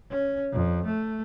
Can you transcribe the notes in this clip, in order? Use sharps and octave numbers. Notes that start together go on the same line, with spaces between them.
C#4
F2
A3